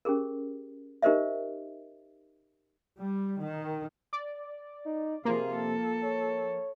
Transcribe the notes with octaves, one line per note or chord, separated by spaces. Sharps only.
C#4 G4 G#4 A#4
D#4 G4 A#4 C5 D#5 E5
G3
D#3
D5
D#4
C3 F3 A#3 F4 G#4
A4
C#5